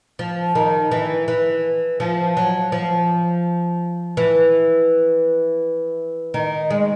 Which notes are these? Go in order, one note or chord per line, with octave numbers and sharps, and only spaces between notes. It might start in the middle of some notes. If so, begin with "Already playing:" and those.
F3
D#3
E3
E3
F3
F#3
F3
E3
D#3
G#3